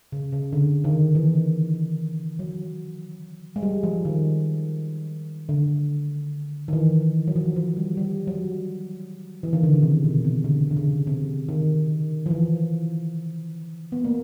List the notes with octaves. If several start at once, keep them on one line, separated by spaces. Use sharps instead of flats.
C#3
C#3
D3
D#3
E3
F#3
G#3
G3
F3
D#3
D3
D#3
E3
F#3
F3
F3
G3
G3
F#3
E3
D#3
D3
C#3
C3
B2
C3
D3
D3
C#3
C3
D#3
F3
E3
B3
A#3